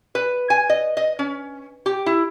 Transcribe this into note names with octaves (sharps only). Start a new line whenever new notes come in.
B4
G#5
D#5
D#5
C#4
G4
E4